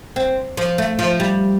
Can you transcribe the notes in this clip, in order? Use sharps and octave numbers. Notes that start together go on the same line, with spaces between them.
C4
F3
A3
F3
G3